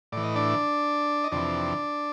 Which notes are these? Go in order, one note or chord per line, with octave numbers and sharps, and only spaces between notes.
A2 E3 D5
D#5
D4 D5
D#5
F2 C3 E3 D4 D5